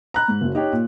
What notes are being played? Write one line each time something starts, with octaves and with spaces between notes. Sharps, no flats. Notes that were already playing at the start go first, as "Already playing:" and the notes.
A#5 B5 F#6
G#2
F#1 F#3
D#4 G4 C#5
A#2